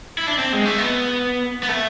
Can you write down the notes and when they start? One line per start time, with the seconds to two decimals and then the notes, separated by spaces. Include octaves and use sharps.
0.18 E4
0.27 D4
0.38 C4
0.53 G#3
0.66 A3
0.78 B3
1.63 B3
1.69 A3